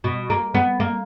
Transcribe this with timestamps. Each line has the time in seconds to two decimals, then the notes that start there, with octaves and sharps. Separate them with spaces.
0.04 B2
0.30 A#3
0.54 B3
0.80 A#3